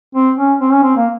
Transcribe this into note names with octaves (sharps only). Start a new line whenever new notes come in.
C4
C#4
C4
C#4
C4
A#3